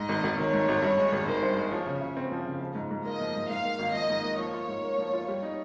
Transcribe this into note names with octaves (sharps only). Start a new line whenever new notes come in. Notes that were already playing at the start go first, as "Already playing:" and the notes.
Already playing: G#2 D#5
G#1
G#1
D#3 C#5
G#2
G#1
G2
G#3
G#1
D#3 C5
G2
G#3
F3 C#5
C#3
C#3
C4
F3
C#3
F3
G#2
G#2
A#3 D#5
F3
G#2
G#2 F5
A#3
G#1
F3 D#5
G#2
A#3
F3 C#5
F4
G#2
A#3
F3
F4
G3 C#5
D#4